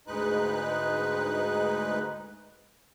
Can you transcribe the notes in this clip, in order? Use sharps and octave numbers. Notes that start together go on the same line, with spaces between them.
D2 G#2 G#3 D#4 B4 F#6